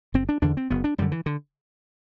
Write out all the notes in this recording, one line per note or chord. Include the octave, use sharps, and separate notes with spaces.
F#1 C4
D4
E2 D3 D4
C4
F#1 B3
D4
F#2 D3 G3
E3
D3